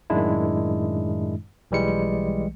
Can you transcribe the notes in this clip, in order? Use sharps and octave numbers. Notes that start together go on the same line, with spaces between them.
F#2 A2 D#3 G#3 D4 E4
B1 E3 G3 G#3 C#7